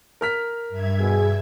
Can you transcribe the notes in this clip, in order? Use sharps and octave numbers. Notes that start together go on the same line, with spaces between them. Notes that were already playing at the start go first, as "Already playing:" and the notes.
A#4 F6 B6
G2 E5 G#6
B2 G#4